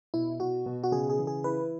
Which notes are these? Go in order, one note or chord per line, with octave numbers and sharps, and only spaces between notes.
B2 E4
B2 F#4
B2
F#4
C#3 G#4
G#4
E3
G#4
E4 B4